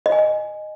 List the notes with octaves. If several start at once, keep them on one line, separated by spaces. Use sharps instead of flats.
D#5
G#5
D#5